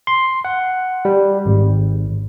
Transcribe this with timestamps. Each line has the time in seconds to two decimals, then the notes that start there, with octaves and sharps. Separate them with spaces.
0.07 C6
0.45 F#5
1.05 G3
1.46 G#1